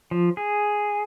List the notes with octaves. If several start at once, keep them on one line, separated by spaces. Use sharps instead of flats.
F3
G#4